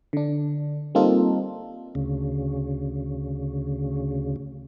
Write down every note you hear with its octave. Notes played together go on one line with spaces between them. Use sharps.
D3 D4
G3 A#3 C4 D#4 F4 A4
D2 C#3